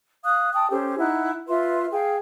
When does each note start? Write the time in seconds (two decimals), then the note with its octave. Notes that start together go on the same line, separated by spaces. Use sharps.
0.24 F5 D#6 F#6
0.54 G5 A5 D#6
0.70 C#4 G4 A4 C5
0.99 D#4 E4 F#5 F#6
1.48 F4 B4 E5 C6
1.92 G#4 F5 G5